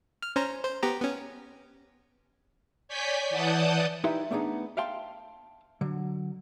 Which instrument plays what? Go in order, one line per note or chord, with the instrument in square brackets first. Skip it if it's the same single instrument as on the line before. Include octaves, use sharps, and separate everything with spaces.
[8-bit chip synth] F6
C#4 C5 A#5
C5
B3 G4 A#5
B3 C#4
[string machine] C#5 D5 G#5 G6 B6
E3 D5 F#5 A5 D#6 G6
[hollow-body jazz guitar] D#4 E4 G4 B4 E5 C6
A3 B3 D4 D#4 G#4
E5 F5 G5 A5 C6
D3 F#3